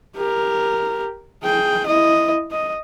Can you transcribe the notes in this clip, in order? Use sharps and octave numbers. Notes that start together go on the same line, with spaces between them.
G4 A#4
G#4 G5
E4 D#5
D#5